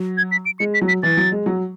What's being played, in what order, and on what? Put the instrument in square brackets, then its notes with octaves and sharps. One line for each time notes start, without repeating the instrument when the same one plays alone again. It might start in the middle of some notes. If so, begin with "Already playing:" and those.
Already playing: [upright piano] F#3
[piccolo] G#6
B6
D7
[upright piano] G#3 [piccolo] C#7
[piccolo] B6
[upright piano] F#3
[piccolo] B6
[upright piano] E3 [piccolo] A6
[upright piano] F#3
G#3
F#3